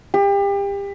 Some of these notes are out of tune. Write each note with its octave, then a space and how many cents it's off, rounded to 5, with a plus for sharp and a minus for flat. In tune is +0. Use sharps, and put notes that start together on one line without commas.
G4 +30